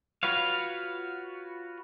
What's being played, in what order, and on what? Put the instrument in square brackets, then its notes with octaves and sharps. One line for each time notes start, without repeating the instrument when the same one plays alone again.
[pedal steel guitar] F4 F#4 B4 C#5 F5